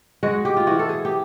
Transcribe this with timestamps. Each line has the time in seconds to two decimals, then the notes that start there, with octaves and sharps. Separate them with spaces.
0.23 G#3 F#4
0.45 G4
0.57 F4
0.67 E3 F#4
0.79 A4
0.89 G#4
1.05 G4